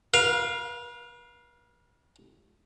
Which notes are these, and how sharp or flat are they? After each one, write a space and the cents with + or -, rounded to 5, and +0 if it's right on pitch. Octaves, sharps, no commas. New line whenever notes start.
B4 -40 F5 +0